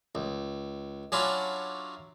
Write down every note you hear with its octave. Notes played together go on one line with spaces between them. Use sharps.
C#2
F#3 C#4 D4 E4 F4